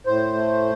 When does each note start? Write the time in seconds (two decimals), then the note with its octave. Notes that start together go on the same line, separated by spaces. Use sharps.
0.06 A2 C5
0.34 A3